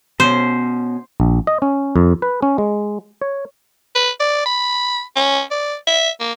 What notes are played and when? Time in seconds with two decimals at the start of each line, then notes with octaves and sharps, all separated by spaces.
0.20 B2 C#4 C5
1.20 A#1
1.47 D#5
1.62 C#4
1.96 F2
2.22 B4
2.42 C#4
2.58 G#3
3.21 C#5
3.95 B4
4.20 D5
4.46 B5
5.16 C#4
5.51 D5
5.87 E5
6.20 A#3